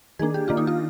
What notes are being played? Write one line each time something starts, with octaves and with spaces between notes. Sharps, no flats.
D#3 A#3 D4 G#4
G4
D#3 A#3 D4 F4
D#4
F4